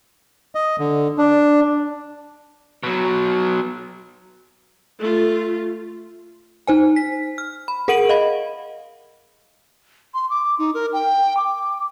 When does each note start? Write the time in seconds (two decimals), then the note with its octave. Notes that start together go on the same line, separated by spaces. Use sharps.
0.55 D#5
0.79 D3
1.18 D4
2.83 B2 F#3
4.99 A3 F4
6.67 D#4 C5 G#5
6.96 B6
7.38 F6
7.68 B5
7.88 G#4 A#4 F#5 D7 D#7 F#7
8.09 D#5 F5 B5
10.14 C6
10.30 D6
10.59 D#4
10.74 A#4
10.93 G5
11.37 D6